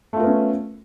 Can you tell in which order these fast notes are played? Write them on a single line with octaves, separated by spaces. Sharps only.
A3 F4 A#4 B3 C#4